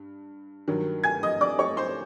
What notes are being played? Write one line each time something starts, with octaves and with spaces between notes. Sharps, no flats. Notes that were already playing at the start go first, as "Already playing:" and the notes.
Already playing: G2
G2 D#3 F#3
G#5 G#6
D#5 D#6
D5 D6
C#5 C#6
C5 C6